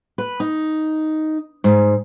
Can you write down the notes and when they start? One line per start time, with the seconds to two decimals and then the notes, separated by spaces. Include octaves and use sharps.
0.18 B4
0.40 D#4
1.64 G#2